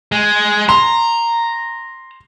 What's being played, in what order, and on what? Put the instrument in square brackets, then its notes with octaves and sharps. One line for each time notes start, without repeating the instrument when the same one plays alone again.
[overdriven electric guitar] G#3
[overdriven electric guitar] A#5 [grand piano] C6